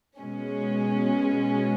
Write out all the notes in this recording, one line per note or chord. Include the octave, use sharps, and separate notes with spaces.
B2 G#3 C#4